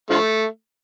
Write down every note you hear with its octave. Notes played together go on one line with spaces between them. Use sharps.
D3 F3 A3